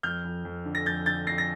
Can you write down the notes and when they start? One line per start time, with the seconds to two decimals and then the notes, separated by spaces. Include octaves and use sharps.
0.03 F2 F6 G6
0.24 F2
0.45 F2
0.65 D3
0.75 A#6
0.86 F2 G6 A6
1.06 D3 G6 A6
1.27 F2 A#6 C7
1.38 A#6